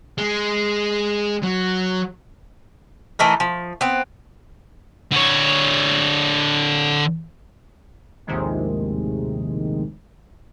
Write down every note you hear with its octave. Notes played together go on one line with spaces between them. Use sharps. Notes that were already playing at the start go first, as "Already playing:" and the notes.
G#3
F#3
E3 A3 D#4 A#4
F3
B3 C4
D3 C#5
A#1 D#2 A2 C3 D#3 G#3